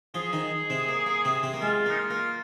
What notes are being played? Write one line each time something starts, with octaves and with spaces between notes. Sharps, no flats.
F3 F4 G#4
D#3 D#4
C3 C4
A#3
A#3
C3 C4
C3 C4
A#3
G#3 F4
A#3
D#4
F4
A#3